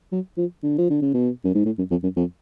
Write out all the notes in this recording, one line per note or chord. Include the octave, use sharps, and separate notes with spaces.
F#3
F3
D3
F3
D3
C#3
B2
F#2
G#2
A2
F#2
F2
F#2
F2